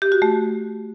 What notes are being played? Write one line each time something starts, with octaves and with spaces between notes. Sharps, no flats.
G4
F#4
A3